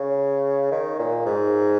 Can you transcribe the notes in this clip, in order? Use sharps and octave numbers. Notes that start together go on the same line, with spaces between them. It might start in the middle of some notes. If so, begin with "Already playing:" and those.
Already playing: C#3
D#3
A#2
G#2